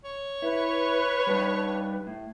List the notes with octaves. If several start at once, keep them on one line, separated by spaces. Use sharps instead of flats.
C#5
E4 B4
G3 D4 D#4
A2